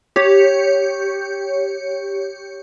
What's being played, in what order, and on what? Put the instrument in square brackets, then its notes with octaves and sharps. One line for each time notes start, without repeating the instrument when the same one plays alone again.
[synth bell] G4 C#5